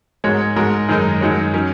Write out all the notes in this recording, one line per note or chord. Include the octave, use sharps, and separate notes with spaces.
G#2 G#3 F#4 A#4 C#5
G#2 G#3 F#4 A#4
F#2 D#3 G#3 D#4 A#4
F#2 D#3 G#3 F#4 C#5
D#3 F#3 C#4